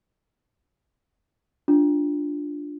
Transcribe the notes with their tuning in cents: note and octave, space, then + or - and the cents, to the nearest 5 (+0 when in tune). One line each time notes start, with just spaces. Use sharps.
D4 +0 F4 +0